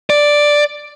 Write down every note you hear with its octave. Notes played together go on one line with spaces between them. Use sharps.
D5